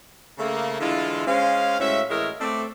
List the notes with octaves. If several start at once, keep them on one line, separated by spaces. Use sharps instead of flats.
C#3 A3 A#3
D3 E3 G#3 E4 F4
G#3 C#4 C5 F5
A2 G#3 C#4 F#4 E5
A2 E3 G#3 A#4 C#5 E5
A3 C4 D5